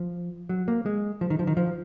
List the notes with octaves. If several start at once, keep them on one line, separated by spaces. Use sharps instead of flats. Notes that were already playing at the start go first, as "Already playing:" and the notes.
Already playing: F3
F#3
A#3
G#3
F3
D#3
F3
D#3
F3